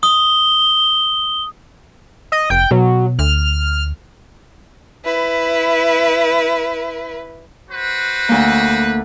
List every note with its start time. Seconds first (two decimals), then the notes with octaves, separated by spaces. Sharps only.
0.03 D#6 G7
2.32 D#5
2.50 F1 G5
2.71 B2 F#3
3.19 D2 F6
5.05 E4 B4
7.71 F#4 B4 C5
8.29 D2 A#3